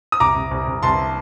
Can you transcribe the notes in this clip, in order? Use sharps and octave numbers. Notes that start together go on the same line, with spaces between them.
D#6
C2 A#5 D6
C2
C2
C2
C2 A5 C6